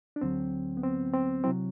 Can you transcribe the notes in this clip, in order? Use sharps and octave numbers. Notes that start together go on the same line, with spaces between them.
D4
D2 D3 F#3 C4
B3
C4
C4
C3 F#3 C4 E4